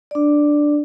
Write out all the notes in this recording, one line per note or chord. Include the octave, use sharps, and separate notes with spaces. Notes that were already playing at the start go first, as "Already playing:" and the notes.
D4 D5